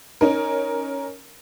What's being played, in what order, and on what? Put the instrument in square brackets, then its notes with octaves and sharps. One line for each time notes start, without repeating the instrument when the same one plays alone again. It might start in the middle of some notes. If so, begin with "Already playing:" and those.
[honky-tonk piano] C#4 D#4 A#4